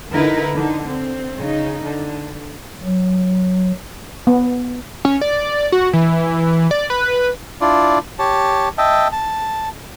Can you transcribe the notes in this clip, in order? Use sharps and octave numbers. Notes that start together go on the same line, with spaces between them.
D3 D#4 E4 A#4 B4
D3 D#4
C4
C#3 D#4
D3
F#3
B3
C#4
D5
F#4
E3
D5
B4
D4 E4 F4 D5
G4 C#5 A5
D#5 E5 G5 A5
A5